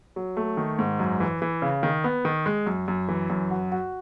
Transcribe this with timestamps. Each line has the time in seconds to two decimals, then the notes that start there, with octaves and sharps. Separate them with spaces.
0.16 F#3
0.37 A3
0.57 D#3
0.79 G#2
0.99 F#2
1.20 E3
1.42 E3
1.62 C#3
1.83 D#3
2.04 B3
2.25 D#3
2.46 G#3
2.66 F#2
2.88 F#2
3.09 E3
3.30 F#2
3.51 F#4
3.71 F#4